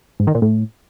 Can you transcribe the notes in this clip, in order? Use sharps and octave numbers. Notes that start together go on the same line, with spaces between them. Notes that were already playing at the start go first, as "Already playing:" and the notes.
G#2
D#3
A#2
A2